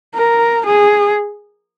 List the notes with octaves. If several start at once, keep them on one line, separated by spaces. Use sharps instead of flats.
A#4
G#4